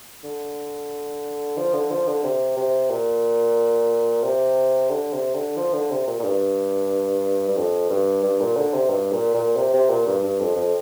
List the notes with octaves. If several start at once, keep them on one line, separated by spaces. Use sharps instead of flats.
D3
F3
D3
F3
D3
C3
C3
A#2
C3
D3
C3
D3
F3
D3
C3
A#2
A#2
G2
G2
F2
G2
G2
A#2
D3
C3
G2
A#2
A#2
C3
C3
A#2
G2
G2
F2
F2